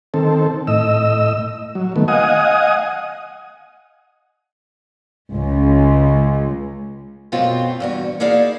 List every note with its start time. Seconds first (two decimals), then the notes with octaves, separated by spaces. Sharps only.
0.14 D#3 C4 A4
0.67 A2 D#5 E6
1.75 F#3
1.96 D#3 A3 B3
2.08 D#5 F5 F#5 G#5 D#6
5.33 C#2
7.32 F#2 B2 A3 B3 C4 F4
7.80 E2 G2 F#4
8.20 A#3 D#4 E4 G#4 D5 F5